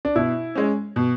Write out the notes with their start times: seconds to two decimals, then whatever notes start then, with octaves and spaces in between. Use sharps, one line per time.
0.05 D4
0.16 B2 E4
0.55 G#3 C#4
0.96 B2